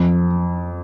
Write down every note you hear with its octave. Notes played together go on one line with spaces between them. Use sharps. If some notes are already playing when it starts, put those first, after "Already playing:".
Already playing: F2